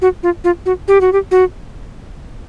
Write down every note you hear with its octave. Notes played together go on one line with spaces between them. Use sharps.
F#4
F4
F4
F#4
G4
F#4
G4
F#4